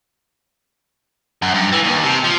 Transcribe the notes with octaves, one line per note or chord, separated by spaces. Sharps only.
F#2
G2
E3
D#2
C3
F3